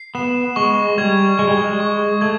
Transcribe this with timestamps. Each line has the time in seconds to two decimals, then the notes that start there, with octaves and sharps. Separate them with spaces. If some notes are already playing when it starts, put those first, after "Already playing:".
Already playing: C7
0.15 B3 E7
0.56 G#3 C#6
0.97 G3 G#6
1.39 G#3 G#6
1.48 G3
1.57 G#3
1.80 C#6
2.21 A3 G#6